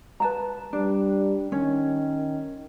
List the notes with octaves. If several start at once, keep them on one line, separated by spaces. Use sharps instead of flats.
B4 A5 A#5
G3 D4
D#3 C#4